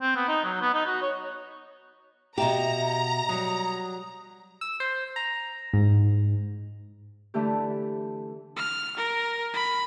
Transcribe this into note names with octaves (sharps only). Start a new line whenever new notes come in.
C4
B3
D#4
F#3
B3
D#4
F#4
C#5
B2 G4 E5 F5 A#5
F#3 G3 D#6
E6
C5
A#5
G#2
D3 E3 A3 G4
F6
A#4
B5